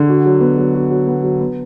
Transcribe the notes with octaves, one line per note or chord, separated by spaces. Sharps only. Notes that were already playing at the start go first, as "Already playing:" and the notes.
Already playing: D3
F#4
F#3
B3
F#3
F#4
F#3
B3
F#3
B3